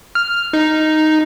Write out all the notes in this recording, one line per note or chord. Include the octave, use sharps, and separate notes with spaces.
F6
D#4